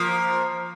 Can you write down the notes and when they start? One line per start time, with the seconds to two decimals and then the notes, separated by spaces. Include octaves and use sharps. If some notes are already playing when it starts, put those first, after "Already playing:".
Already playing: F3 A#3